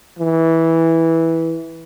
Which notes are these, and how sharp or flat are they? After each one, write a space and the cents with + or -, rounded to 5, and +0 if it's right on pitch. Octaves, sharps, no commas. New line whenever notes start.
E3 -10